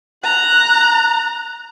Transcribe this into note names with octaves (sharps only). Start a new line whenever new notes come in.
A#5 F#6